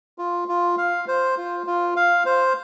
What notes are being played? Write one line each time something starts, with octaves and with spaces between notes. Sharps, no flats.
F4
F4
F5
C5
F4
F4
F5
C5